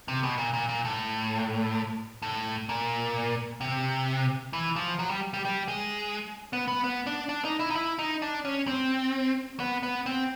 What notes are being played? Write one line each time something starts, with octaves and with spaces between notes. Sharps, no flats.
C3
B2
A#2
A#2
A#2
A2
A2
A#2
C3
E3
F3
F#3
G3
G3
G3
G#3
B3
B3
B3
D4
D4
D#4
E4
D#4
E4
D#4
D4
C#4
C4
B3
B3
C4